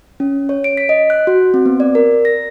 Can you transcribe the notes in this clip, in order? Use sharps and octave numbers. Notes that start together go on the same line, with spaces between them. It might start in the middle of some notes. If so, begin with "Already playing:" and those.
C#4
C#5
D7
B6
D#5
F#6
F#4
C4
B3
D5
A#4
A#6